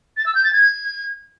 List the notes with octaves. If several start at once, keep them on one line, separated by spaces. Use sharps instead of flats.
A6
E6
G6
A6
G#6